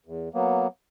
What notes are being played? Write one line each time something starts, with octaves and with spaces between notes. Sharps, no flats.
E2
F#3 A#3 B3